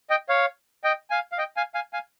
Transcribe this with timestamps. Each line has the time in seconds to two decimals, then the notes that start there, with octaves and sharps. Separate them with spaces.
0.10 D#5 G5
0.29 C#5 F5
0.84 D#5 G5
1.10 F5 G#5
1.32 F5
1.38 D#5 G5
1.57 F5 G#5
1.74 F5 G#5
1.93 F5 G#5